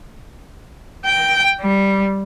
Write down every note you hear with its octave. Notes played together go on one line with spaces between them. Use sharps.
G5
G3